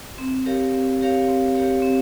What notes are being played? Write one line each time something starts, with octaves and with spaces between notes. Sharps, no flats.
C4
G4 A#4 C#5 F5
C4
G4 A#4 C#5 F5
C4
G4 A#4 C#5 F5
C4